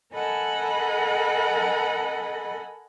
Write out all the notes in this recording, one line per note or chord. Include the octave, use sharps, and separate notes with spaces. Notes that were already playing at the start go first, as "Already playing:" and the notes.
A4 A#4 D#5 F#5 G#5 B5